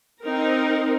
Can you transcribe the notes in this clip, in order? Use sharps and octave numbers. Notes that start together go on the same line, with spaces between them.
C4 D#4 A#4